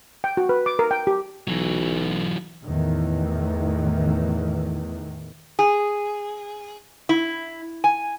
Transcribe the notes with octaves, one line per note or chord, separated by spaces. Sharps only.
G5
F#4
B4
D6
A#4
G5
G4
B1 E3 F#3
E2 A2 D#3 E3
G#4
E4
G#5